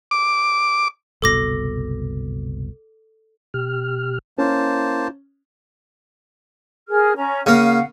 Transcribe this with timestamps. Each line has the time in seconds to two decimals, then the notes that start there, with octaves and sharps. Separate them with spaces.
0.11 D6
1.22 F#1 C2 B2 A4 D6 A#6
3.54 B2 G4 F6
4.38 A#3 C#4 E4 C5 A5
6.88 G#4 A#4 F6
7.17 C#4 A#5
7.46 C#3 A#3 F5 F#5